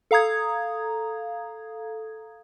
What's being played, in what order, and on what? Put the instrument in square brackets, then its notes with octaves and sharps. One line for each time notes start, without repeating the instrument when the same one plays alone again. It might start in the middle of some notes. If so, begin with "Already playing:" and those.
[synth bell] A4 F5 A#5 D#6 G#6